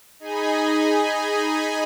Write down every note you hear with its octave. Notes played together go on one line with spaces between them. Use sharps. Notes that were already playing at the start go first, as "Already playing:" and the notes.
D#4 G#4 D#5 G#5 B5